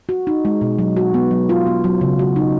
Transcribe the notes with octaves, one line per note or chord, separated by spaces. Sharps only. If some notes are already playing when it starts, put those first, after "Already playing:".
F#4
D#4
G#3
B2
F#3
F#4
B3
F#3
F4
B3
F#3
C#3
F#4
D#4